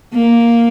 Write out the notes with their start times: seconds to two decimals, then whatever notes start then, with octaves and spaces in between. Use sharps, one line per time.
0.14 A#3